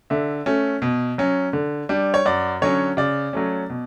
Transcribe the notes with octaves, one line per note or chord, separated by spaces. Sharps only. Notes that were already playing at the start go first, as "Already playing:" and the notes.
D3 E5
A3 C#4
B2
F#3 C#4
D3
G3 D4
C#5
F#2 D5
D3 F#3 C#4 C#5
C#3 D5
F#3 A3 C#4
B2